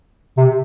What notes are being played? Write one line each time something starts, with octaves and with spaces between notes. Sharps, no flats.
C3